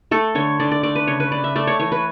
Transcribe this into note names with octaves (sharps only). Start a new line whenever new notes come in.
A3 A4
D3 C#5
D3 D5
D5
A3 D5
B4
C#3 C#5
B4
C#3 D5
E5
A3 D5
C#5
E3 C#5
B4